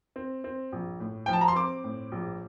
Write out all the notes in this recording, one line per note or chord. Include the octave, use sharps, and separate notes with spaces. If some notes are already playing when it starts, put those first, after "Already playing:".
C4
C4
A#1
A2
F3 G5
A5
A#5
C6
C4 D6
A2
A#1